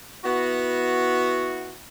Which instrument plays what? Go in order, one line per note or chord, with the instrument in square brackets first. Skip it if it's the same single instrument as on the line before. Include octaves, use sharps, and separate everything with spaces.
[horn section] B3 E4 F#4